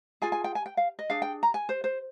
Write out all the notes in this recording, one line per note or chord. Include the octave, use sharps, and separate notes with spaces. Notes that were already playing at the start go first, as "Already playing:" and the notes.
F4 G#4 G#5
G#5
G5
G#5
G5
F5
D#5
D4 G#4 F5
G5
A#5
G#5
C5
C5